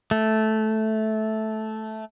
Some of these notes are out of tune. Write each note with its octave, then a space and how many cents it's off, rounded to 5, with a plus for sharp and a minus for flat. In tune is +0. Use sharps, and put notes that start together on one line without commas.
A3 -10